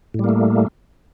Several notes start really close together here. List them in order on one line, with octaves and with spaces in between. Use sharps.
A2 G3 A#3 A3